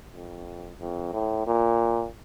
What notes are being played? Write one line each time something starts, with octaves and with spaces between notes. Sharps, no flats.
F2
F2
A2
A#2